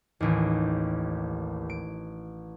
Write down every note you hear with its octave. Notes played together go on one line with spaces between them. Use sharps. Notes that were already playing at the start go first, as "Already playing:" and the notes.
A1 D#2
D7